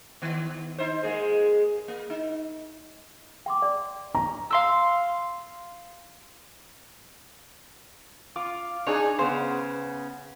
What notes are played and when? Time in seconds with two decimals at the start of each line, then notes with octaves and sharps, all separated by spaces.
0.22 D#3 B3
0.78 D#4 C5
1.03 G#3 A#3 G#4
1.88 A#3
2.10 D#4
3.46 G5 C6 D6
3.62 D5
4.15 A#5 C#6
4.51 F5 C6 E6
8.36 F4 D6
8.87 D4 D#4 G#4 C#5 G#5
9.19 C#3 B3 C5